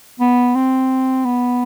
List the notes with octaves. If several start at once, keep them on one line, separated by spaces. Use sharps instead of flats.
B3
C4
B3